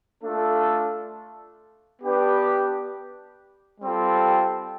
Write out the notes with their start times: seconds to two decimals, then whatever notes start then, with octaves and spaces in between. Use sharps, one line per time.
0.24 A3 D4 F4 A4
2.02 B3 D4 G4 B4 D5
3.81 G3 C4 F4 A4